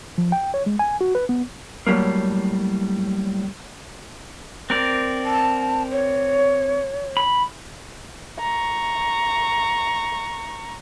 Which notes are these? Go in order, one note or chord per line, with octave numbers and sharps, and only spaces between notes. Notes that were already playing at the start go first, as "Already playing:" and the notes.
F3
G5
C#5
G#3
G#5
F#4
B4
B3
A2 F#3 G3 A3 A#3
C4 A#4 D5
A5
C#5
B5
A#5 C#6